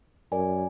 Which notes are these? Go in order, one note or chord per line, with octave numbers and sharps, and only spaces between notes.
F#2 A#4 D5 G#5